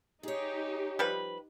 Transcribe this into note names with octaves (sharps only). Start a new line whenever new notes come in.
D#4 G4 G#4 C#5
F3 G3 B4